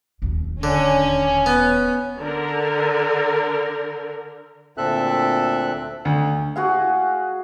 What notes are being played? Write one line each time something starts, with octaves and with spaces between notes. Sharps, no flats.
D1 D#2
D3 C#4
B3
D3 A#4
D2 A#2 C4 A4 E5 F#6
D2
F#4 G#4 F5